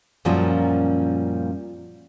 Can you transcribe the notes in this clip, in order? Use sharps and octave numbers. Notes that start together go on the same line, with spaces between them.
F#2 A#2 F3 G3 A#3 C#4